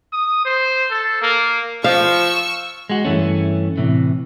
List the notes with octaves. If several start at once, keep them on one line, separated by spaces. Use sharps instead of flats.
D#6
C5
A4
A#3
F3 F5 C#6 E6
G#3 F#4
G2 E3 A3 C#4
A2 C3 E3